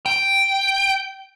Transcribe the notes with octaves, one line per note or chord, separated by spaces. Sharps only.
G5